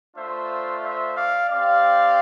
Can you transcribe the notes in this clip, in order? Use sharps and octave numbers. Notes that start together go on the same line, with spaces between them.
A3 D4 F4 C5 E5
C5 E5
D5 F5
C4 G4 D5 F5